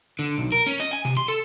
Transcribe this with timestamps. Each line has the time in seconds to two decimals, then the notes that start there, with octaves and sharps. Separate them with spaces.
0.19 D3
0.38 B1
0.52 A#4
0.67 C#4
0.80 D#5
0.93 G#5
1.05 C3
1.17 C6
1.28 A4